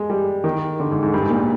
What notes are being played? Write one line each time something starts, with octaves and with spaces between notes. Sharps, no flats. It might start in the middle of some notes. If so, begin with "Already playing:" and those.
Already playing: G#3
G3
D#3
D3
G#2
G#2
G2
G#2
A#2